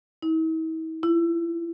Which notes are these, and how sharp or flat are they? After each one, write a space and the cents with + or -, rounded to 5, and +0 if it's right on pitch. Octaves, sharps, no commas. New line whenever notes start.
E4 -45
E4 +35